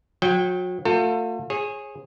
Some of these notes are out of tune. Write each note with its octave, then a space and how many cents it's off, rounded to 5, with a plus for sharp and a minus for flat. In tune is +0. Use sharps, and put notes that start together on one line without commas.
F#3 -35 G5 +0
A3 +40 F4 +45 A4 +35
G#4 +0 C#5 -30